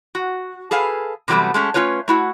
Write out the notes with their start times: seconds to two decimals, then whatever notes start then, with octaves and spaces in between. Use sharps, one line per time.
0.15 F#4
0.71 G#4 A4 B4 F5 G#5
1.28 C3 E3 F#3 G3 A3 B3
1.54 G#3 A3 C#4
1.74 A3 C#4 F4 B4 C#5
2.08 A3 E4 F#4